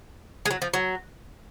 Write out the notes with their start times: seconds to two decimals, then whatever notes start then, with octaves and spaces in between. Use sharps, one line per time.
0.46 G#3
0.51 F#3
0.62 F3
0.74 F#3